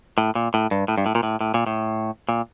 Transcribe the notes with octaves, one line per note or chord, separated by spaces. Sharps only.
A2
A#2
A2
G2
A2
G2
A2
A#2
A2
A2
A#2
A2
A#2